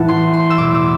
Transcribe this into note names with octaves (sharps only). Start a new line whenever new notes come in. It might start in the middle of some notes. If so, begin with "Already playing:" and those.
Already playing: A2 E3 A3 F#5 A5
C6
C6
E6
E2 B2 A3 D6
E6